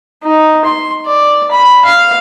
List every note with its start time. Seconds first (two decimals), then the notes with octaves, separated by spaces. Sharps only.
0.23 D#4
0.65 C6
1.05 D5
1.51 B5
1.85 F5